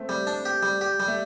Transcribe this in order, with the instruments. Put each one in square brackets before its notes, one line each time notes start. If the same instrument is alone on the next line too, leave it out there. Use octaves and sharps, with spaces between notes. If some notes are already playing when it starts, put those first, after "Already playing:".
Already playing: [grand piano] A3 C4
[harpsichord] G3
D4
G4
G3
G4
G3
[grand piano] A3